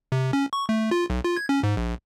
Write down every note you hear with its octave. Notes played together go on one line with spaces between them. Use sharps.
C3
C#4
C#6
A3
F4
B1
F4
G#6
C#4
G#2
A#1